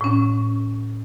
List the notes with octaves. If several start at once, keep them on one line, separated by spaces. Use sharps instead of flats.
A2 C#4